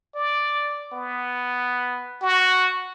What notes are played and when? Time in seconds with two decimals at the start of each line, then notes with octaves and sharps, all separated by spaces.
0.15 D5
0.92 B3
2.22 F#4